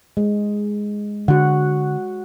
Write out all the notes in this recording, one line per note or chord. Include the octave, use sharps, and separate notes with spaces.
G#3
D3 F#4 F#5